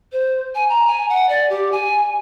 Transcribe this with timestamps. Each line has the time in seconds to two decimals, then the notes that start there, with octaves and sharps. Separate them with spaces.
0.12 C5
0.55 G#5
0.69 A#5
0.87 G#5
1.09 F#5
1.29 D5
1.50 G4
1.72 G#5